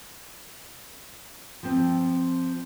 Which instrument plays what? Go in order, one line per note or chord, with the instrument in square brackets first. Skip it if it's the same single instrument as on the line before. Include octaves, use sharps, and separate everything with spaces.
[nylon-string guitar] F3 C4